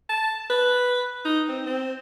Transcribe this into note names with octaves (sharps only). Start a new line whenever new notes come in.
A5
B4
D#4
C4
C4